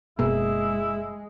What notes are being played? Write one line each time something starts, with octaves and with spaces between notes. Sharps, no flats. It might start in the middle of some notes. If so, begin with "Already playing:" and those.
F#1 B2 G#3 A#3 E4 G#4